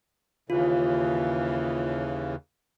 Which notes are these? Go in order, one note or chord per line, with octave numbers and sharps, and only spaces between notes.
D#2 C#3 E3 F4